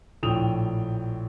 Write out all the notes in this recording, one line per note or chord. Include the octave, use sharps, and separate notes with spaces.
A#1 A2 G5 D#6 F7